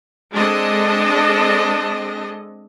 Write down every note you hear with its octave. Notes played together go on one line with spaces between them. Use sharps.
G#3 C4 D4 A4 D#5